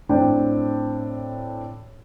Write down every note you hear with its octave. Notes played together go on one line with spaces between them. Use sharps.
A2 C4 D4 G5